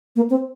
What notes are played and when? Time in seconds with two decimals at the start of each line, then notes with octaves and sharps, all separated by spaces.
0.16 A#3
0.30 C4